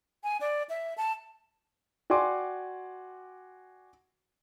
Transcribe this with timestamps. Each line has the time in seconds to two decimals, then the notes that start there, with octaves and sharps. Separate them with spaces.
0.24 G#5
0.41 D5
0.69 E5
0.98 A5
2.10 F#4 D5 G5 G#5 C6 D6